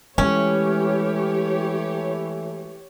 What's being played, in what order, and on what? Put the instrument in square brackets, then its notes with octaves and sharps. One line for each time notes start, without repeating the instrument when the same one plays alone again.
[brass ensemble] E3 A3 [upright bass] G#3 [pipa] C#4 [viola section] G4 C#5